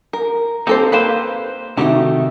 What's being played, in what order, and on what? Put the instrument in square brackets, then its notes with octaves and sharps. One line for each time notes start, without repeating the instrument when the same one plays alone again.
[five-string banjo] A#4
[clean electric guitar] A#3 C4 D#4 [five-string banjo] G4 A4 C5
[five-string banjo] A#3 F5 G5 [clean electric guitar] B4 C5
[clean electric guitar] C3 D#3 A3 [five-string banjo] D#4 F#4 G4